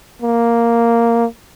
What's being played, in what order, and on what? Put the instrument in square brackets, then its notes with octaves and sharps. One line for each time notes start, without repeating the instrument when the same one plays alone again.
[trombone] A#3